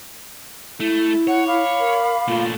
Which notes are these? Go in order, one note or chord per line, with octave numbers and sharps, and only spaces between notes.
A3 E4
C#5 F#5
F5 B5 D6
A#4
A#2 A3 F4